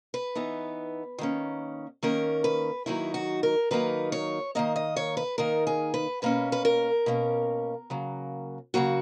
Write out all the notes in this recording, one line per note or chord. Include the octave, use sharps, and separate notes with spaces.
B4
E3 B3 D#4
D#3 A#3 C#4
D#3 A#3 C#4 A#4
B4
D#3 F#3 A#3 D#4 E4
F#4
A#4
D#3 F#3 A#3 D#4 B4
C#5
D#3 A#3 D#4 D#5
D#5
C#5
B4
D#3 A#3 D#4 A#4
G#4
B4
B2 A#3 C#4 B4
B4
A#4
B2 A#3 C#4
C#3 F#3 A#3
C#3 F#3 A#3 F#4